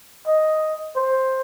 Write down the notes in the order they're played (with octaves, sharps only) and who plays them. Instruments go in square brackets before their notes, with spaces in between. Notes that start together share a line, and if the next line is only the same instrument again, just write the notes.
[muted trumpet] D#5
C5